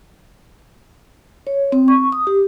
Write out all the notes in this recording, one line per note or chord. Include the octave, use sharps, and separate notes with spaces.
C#5
C4
C#6
D#6
G4